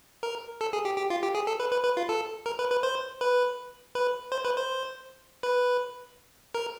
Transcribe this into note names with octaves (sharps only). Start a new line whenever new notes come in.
A#4
A4
G#4
G4
G4
F4
G4
G#4
A4
B4
B4
B4
F4
A4
A#4
B4
B4
C5
B4
B4
C5
B4
C5
B4
A#4